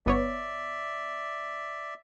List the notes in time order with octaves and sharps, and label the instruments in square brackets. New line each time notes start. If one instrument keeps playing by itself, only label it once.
[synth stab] G1 B3 C#5 [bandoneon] D5 E5